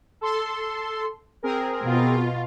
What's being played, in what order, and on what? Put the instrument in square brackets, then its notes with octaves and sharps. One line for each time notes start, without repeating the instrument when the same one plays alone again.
[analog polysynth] A4 C6
C4 G#4 A#4
[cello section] B2 F4